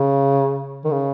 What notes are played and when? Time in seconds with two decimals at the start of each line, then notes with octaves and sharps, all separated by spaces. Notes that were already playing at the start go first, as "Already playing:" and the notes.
Already playing: C#3
0.85 D#3
0.92 C#3